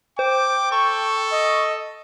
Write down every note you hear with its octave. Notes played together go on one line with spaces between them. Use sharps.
C5 G5 D6
A4 C#6
D#5